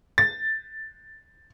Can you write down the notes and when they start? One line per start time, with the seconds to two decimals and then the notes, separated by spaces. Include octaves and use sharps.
0.18 A6